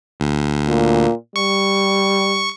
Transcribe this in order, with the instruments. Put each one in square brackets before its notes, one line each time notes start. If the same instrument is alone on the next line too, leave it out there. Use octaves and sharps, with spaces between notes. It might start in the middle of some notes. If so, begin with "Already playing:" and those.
[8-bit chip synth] D2
[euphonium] A#2
[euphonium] G3 [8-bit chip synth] C#6